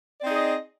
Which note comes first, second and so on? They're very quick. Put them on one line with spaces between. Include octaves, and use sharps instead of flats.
D5 C4 D#4 G#4 D#5